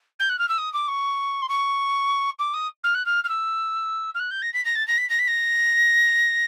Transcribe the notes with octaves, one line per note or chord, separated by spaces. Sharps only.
G6
F#6
F6
E6
D#6
D6
C#6
C6
C#6
D6
D#6
F6
F#6
F6
F6
E6
F6
F#6
G6
A#6
B6
A#6
A6
A#6
B6
A#6
B6
A#6